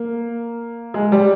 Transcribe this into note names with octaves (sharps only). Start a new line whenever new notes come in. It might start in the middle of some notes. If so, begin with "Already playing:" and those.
Already playing: A#3
G#3
G3